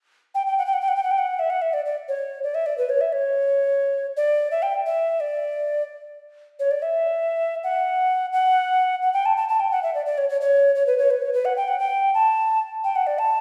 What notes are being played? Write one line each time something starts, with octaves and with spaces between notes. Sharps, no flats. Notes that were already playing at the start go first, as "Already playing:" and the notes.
G5
G5
F#5
G5
F#5
G5
F#5
G5
F#5
G5
F#5
E5
F#5
E5
D5
D5
C#5
D5
E5
D5
B4
C#5
E5
C#5
D5
E5
G5
E5
D5
C#5
D5
E5
F#5
F#5
F#5
G5
A5
A5
A5
G5
F#5
E5
D5
D5
C#5
C#5
C#5
C#5
B4
C#5
B4
C#5
B4
F#5
G5
F#5
G5
A5
G5
F#5
D5
A5